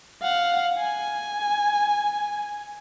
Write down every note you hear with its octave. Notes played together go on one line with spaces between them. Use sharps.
F5 F#5
G#5